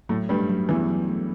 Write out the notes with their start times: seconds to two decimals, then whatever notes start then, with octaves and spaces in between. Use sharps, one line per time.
0.09 A2 F#3 A3
0.29 G2 G3 A3
0.49 F#3
0.69 E2 E3 D4
0.89 F#3
1.08 A3